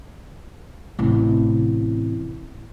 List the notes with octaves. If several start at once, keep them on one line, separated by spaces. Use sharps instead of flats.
A1 C3